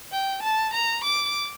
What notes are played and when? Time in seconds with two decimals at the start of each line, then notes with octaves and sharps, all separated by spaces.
0.12 G5
0.43 A5
0.74 A#5
1.04 D6